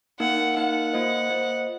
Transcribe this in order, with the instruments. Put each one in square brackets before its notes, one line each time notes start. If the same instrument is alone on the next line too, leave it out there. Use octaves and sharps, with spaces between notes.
[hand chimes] A#3 D#4 A#4 F5 [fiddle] F#5
[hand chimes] A#3 D#4 A#4 F5 [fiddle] F#5
[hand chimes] A#3 F4 C5 D#5
A#3 F4 C5 D#5